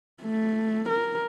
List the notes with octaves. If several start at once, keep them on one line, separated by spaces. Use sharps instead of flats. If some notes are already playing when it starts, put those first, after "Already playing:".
A3
A#4